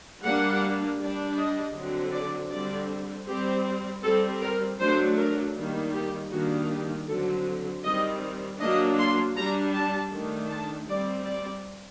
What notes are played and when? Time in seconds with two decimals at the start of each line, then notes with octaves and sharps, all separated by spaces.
0.23 G3 A#3 D4 F#5
0.98 G3 D4
1.36 D#5
1.75 D3 F#3 C4
2.12 D5
2.50 D3 G3 C4 D5
3.27 G3 C4 G4
4.03 G3 C4 A4
4.41 A#4
4.80 F#3 A3 D4 C5
5.17 A#4
5.56 D#3 G3 A#3
5.94 G4
6.31 D#3 G3 A#3 D4 F#4
6.69 G4
7.08 D3 F#3 C4 A4
7.84 D#3 G3 C4 D#5
8.60 F#3 A#3 D4 D#5
8.99 C6
9.37 G3 D4 A#5
9.74 A5
10.12 D#3 A3 D4
10.50 A5
10.88 G3 C4 D5
11.26 D5